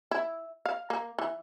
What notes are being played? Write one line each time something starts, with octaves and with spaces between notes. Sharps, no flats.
E4
F5
A#3
E3